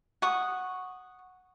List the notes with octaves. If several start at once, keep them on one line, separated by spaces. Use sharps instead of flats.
F#5 C#6 D#6